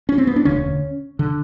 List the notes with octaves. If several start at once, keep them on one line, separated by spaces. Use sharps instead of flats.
C#4
C4
B3
D4
E1 D2 D3 C#4
D3